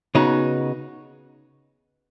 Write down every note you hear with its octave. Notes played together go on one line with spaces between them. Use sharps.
C#3 B3 D#4 F#4